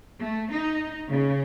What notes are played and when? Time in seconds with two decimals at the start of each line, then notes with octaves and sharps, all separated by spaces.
0.18 A3
0.51 D#4
1.09 C#3